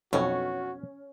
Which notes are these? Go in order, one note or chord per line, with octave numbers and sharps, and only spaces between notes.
B1 F2 B2 C#4 F#4